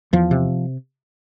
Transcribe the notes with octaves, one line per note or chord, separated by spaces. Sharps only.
E2 F3
C3